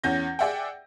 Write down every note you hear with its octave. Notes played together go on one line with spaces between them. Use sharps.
E2 C#4 G6 A#6
G#4 D5 E5 F#5 G5